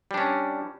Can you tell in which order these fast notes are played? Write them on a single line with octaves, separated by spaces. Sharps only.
G3 D4 C#4